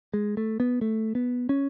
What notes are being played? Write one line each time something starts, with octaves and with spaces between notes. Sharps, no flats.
G#3
A3
B3
A3
B3
C#4